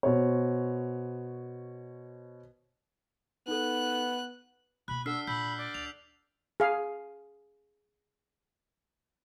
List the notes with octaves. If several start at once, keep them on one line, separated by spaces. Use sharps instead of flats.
B2 C5 C#5
B3 D#4 A4 F#6
B2 A#3 B5 F#6
D4 A4 F#5 E6 F6 B6 C7
A#2 B5 E6 G6 B6
D5
D2 F7
G#4 F5